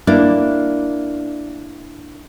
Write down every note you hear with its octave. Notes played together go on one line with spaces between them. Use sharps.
A#3 D4 E4